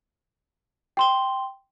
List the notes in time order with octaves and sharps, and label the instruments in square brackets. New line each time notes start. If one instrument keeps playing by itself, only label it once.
[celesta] G5 C6 G7